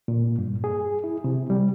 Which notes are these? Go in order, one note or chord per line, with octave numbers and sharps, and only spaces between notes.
A#2
G2
G#4
E4
C3
G3